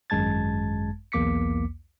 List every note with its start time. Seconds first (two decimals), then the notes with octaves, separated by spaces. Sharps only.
0.10 G#1 F#2 G#3 A5 G#6 A6
1.12 B1 E2 A#3 D6 B6 C#7